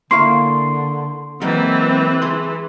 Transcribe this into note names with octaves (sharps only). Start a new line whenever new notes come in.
D3 A#3 E4 F5 C6 C#6 C7
E3 F#3 G#3 A#3 C4
G#4 C6